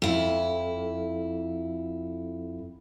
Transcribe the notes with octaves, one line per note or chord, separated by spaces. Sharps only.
F2 E4